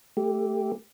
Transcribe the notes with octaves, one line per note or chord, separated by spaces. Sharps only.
A3 G4